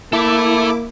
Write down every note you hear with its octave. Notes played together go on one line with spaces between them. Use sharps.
A#3 E4 A4 E5 D6